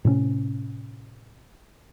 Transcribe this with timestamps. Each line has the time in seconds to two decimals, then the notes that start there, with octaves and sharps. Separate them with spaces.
0.05 A2 C3 C4 C#4